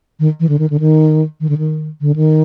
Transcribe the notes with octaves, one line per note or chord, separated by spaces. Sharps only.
D#3
E3
D3
D#3
D3
D#3
D#3
D3
D#3
D3
D#3